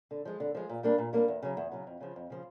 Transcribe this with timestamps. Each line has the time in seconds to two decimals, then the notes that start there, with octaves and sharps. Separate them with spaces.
0.11 D3
0.25 F3 G#3
0.40 D3
0.55 F3 G#3
0.69 A#2
0.83 G3 A#3 D4
0.98 A#2
1.13 G3 A#3 D4
1.28 E2
1.43 C#3 F#3
1.57 E2
1.72 C#3 F#3
1.87 F2
2.01 C#3 F3
2.16 F2
2.30 C#3 F3